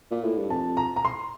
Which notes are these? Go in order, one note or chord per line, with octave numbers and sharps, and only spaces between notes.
A#2
A2
G2
F2 A5
A#5
A#5
C6